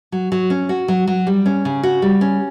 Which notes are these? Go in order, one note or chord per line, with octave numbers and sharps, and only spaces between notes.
F#3
F#3
C#4
F#4
F#3
F#3
G3
C#4
C#3
F#4
G3
C#4